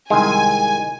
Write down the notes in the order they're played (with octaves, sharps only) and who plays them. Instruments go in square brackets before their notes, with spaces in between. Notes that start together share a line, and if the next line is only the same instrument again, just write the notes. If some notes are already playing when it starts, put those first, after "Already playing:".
[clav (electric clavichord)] C2 D#3 G#3 [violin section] G#5